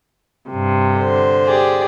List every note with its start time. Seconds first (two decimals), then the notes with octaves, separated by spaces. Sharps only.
0.49 G2 C3
0.97 D3 C5
1.47 G4 G#4 D5